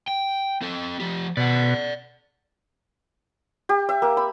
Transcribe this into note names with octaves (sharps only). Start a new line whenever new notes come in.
G5
C4 A4
F3 G4
B2 D5 F#5
G4
E5
A#3
B5